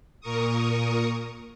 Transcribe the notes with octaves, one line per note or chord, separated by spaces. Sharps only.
A#2 A#4 C#6 D#6